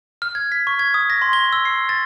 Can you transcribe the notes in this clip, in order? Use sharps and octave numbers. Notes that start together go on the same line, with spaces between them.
F6
G#6
B6
C#6
G#6
D#6
A#6
C6
G7
E6
C7
A6